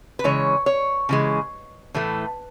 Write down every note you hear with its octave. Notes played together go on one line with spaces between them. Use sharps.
B4
C#3 E3 G#3 C#5
C#5
C#3 E3 G#3
A2 E3 A3